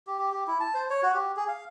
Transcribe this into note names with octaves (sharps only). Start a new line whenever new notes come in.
G4
G4
G4
E4
A5
C5
C#5
F#4
G4
G#4
F5